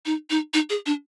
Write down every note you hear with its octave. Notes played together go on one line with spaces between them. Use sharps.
D#4
D#4
D#4
G#4
D4